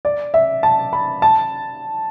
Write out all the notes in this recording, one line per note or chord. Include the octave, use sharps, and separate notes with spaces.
D5
E5
A5
B5
A5